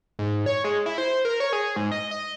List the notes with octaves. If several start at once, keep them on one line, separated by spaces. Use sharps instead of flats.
G#2
C#5
G#3
E4
C5
A#4
C#5
G#4
G#2
D#5
D#5